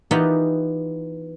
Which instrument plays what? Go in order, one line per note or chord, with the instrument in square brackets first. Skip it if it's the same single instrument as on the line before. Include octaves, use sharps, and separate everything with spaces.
[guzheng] E3 B3 D#4 F4 G4 F#5